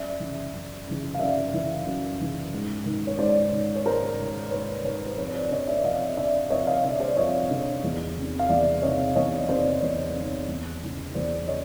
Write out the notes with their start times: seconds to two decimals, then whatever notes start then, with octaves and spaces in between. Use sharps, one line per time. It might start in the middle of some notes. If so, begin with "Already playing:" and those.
Already playing: F#2 D5 E5
0.20 C#3 E3
0.54 F#2
0.87 C#3 E3
1.14 F5
1.19 F#2 D5 E5
1.53 C#3 E3
1.86 F#2
2.19 C#3 E3
2.53 G#2
2.86 D#3
3.07 C#5
3.19 G#2 C5 D5
3.52 D#3
3.75 C#5
3.86 G#2 A#4 C5
4.19 D#3
4.51 G#2 B4 C#5
4.84 D#3 B4 C#5
5.06 C5
5.17 F2 B4 C#5
5.34 C5 D5
5.51 D3 C#5 D#5
5.67 D5 E5
5.84 F2 D#5 F5
6.17 D3 D5 E5
6.50 F2 C#5 D#5
6.67 D#5 F5
6.84 D3 D5 E5
7.00 C5 D5
7.16 F2 C#5 D#5
7.50 D3
7.84 E2
8.17 C3 D#3
8.39 F5
8.49 E2 D5 E5
8.82 C3 D#3 C#5 D#5
9.16 E2 C#5 D#5
9.49 C3 D#3 C5 D5
9.82 E2 B4 C#5
10.15 C3
10.20 D#3
10.48 E2
10.82 C#3 E3
11.14 E2 C5 D5
11.47 C#3 C#5 D#5